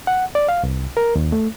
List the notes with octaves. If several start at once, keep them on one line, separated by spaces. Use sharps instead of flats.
F#5
D5
F5
C2
A#4
D#2
A3